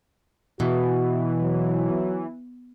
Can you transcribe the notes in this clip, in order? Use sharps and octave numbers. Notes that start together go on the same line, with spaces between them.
B2 E3 F#4
F#3